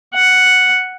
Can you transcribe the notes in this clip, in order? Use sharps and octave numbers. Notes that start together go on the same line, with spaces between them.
F#5